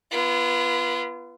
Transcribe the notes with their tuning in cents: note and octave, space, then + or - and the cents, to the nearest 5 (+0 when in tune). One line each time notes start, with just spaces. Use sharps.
B3 -10 F4 -35